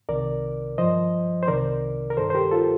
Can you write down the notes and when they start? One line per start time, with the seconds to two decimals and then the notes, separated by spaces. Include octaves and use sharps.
0.09 C2 C3 D#3 A#4 D5
0.78 G2 F3 C5 D#5
1.43 C5
1.47 C2 C3 D#3 A#4 D5
2.10 A#4
2.17 G2 D#3 A4 C5
2.30 C5
2.35 G4 A#4
2.51 F4 A4